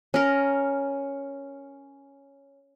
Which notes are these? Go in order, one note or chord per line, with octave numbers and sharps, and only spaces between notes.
C#4 A#4